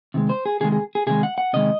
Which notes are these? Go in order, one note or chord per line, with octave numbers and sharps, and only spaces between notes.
C3 D#3 G#3
C5
G#4
C3 D#3 G#3 G#4
G#4
G#4
C3 D#3 G#3 G#4
F#5
F#5
C3 D#3 G#3 D#5